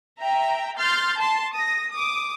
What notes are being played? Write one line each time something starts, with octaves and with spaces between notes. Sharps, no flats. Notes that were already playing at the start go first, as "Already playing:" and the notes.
E5 G5 A#5
C6 F6 G6 A6
A5 C6
D#6 A#6
D6 D#6